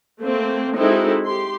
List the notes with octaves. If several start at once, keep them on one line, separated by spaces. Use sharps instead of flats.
A3 A#3 C4
G#3 C4 D#4 E4 F#4 A4
G4 C6